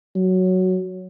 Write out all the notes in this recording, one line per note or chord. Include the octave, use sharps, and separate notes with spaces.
F#3